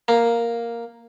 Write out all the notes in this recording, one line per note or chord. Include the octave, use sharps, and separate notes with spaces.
A#3